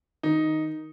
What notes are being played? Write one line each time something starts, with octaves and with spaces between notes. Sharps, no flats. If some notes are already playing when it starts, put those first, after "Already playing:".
D#3 D#4